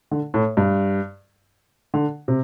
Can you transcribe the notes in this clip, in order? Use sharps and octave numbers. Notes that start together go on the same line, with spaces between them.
D3
A2
G2
D3
C3